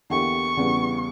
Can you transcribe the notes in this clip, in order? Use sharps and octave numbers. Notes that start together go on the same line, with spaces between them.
E2 D3 A#3 E4 G4 C#6
E2 C#3 G3 B3